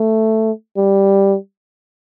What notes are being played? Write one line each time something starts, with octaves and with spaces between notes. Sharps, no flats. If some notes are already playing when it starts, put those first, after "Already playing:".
Already playing: A3
G3